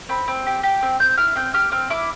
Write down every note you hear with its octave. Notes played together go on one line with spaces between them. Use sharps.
C4 B5
C4
G4
G4
C4
C4 G6
E4 F6
C4 G6
G4 F6
C4 F6
E4 D6